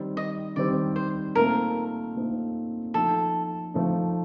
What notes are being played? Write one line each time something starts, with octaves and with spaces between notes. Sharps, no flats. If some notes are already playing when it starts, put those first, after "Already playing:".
Already playing: D#3 G3 C4
D#5
D#3 G3 C4 D5
C5
A#2 A3 C4 D#4 A#4
A#2 A3 C4 D#4
F3 A3 D#4 A4
F3 A3 D#4